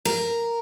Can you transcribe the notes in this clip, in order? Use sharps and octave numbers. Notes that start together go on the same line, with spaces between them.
A#4